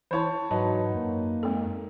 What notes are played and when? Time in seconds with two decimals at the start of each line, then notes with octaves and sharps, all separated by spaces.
0.11 E3 E4 C5 C#5 A5
0.51 G#2 F#3 D#4 B4 A5
0.94 F#2 A#3
1.43 G#3 C4 A4